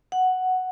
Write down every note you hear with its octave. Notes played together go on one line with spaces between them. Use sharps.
F#5